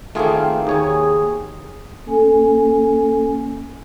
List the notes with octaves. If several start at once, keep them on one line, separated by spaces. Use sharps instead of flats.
D#3 A3 A#3 C4 F4 G#4
D#2 G#4 C#5 G#5
A#3 C#4 A4 G#5